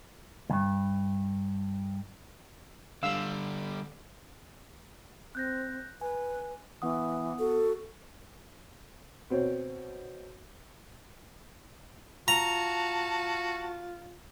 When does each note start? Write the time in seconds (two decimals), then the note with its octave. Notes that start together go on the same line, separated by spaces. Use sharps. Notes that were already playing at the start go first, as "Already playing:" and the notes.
0.50 D2 G2
3.03 D3 G3 F5 E6
5.35 C4 F#6 G6 A#6
6.01 B4 G#5
6.82 E3 B3 F#5 D#6
7.39 F#4 A4
9.30 B2 C4 C#5
12.28 F4 F#4 A5 A#5